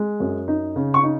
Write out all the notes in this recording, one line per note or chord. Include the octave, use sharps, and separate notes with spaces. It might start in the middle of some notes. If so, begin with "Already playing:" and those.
Already playing: G#3
F#2
D#4
C#3
C#6
D#4